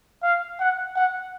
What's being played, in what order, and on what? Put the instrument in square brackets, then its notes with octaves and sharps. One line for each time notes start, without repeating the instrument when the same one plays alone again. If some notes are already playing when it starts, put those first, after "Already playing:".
[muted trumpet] F5
F#5
F#5